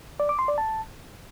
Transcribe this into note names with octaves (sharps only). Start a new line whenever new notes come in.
D5
D6
C6
D5
A5